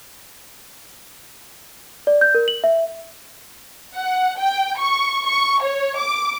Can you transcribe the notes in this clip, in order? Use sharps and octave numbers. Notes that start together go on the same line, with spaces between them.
D5
G6
A#4
F#7
E5
F#5
G5
C#6
C#6
C#5
D6